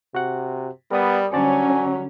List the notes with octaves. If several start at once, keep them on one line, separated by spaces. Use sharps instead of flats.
C3 F#4 F#5
G3 B3 A#4 D5 D#6
D3 F#3 G3 C#4 C5 D5 G#5 A5